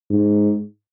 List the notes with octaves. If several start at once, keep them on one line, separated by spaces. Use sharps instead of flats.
G#2